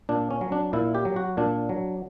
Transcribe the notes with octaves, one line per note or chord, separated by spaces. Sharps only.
A#2 D4
C#4
F#3
D4
A#2 E4
G4
F#3
F#4
A#2 D4
F#3